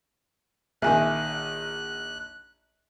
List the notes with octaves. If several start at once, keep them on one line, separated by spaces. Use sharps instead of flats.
A#1 D#3 E5 G#5 F#6